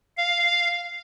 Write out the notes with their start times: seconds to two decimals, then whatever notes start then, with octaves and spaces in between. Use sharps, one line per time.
0.17 F5